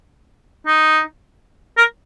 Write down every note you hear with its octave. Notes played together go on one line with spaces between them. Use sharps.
D#4
A#4